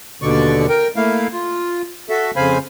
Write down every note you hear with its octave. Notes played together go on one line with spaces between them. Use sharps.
D#2 B2 D3 D5 C#6
A#4 G5
A3 A#3 E4 F5
F4
F#4 A4 E5
F2 C#3 C5 F5 G#5 B5